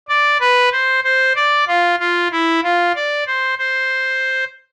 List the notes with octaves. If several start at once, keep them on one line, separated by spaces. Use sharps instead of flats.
D5
B4
C5
C5
D5
F4
F4
E4
F4
D5
C5
C5